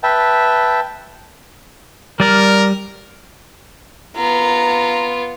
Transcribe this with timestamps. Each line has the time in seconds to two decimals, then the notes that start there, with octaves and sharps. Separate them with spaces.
0.03 B4 E5 G5 A5
2.20 G3 A#4 D5 F6
4.16 B3 F4 A#5